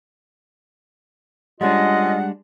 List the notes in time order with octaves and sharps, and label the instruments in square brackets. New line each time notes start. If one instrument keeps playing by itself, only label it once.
[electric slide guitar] G3 G#3 D4 [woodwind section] C#4 F4 D#5 [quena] F#5